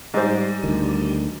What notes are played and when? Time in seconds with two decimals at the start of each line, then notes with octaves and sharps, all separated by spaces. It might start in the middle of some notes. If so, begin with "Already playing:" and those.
0.14 G#2 G3 C5
0.64 D2 D#3